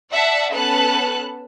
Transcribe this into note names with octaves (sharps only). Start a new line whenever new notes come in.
D5 E5 F#5 A5
B3 C#4 A4 B4 A5 F#6